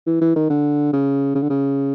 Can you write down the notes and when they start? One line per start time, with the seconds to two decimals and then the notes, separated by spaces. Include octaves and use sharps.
0.06 E3
0.21 E3
0.36 D#3
0.50 D3
0.93 C#3
1.35 C#3
1.42 D3
1.50 C#3